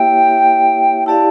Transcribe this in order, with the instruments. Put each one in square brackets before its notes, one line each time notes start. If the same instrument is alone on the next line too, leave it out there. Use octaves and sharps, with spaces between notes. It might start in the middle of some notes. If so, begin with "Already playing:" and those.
Already playing: [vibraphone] A#3 E4 G4 C#5 E5 [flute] G5
[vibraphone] E4 G4 D5 F5 [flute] A5